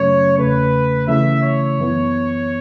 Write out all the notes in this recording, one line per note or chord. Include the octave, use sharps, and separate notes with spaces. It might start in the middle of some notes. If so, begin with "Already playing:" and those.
Already playing: F#2 C#3 F#3 A3 C#4 C#5
E2 C#3 A3 B4
C#3 E3 A3 E4 E5
C#5
F#2 E3 B3